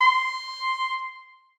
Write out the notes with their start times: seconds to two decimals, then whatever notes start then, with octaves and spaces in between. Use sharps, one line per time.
0.01 C6